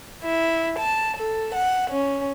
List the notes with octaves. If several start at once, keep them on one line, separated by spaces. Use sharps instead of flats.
E4
A5
A4
F#5
C#4